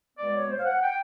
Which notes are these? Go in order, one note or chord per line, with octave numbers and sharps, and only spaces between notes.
B2 G#3 B3 D5
C#5
C5
F5
F#5
G5